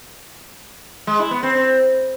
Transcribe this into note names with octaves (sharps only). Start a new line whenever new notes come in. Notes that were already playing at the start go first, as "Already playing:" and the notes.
G#3
E4
B3
C4
C4